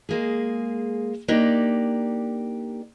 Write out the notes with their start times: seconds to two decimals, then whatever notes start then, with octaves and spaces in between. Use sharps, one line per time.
0.09 G#3 A#3 G#4
1.28 A#3 D4 D#4 G4 D5